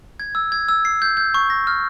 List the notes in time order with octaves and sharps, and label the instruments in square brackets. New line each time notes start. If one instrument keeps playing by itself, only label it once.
[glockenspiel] G#6
E6
G#6
E6
C7
G6
G6
C#6
A#6
F6